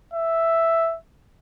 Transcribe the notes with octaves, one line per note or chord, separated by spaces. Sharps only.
E5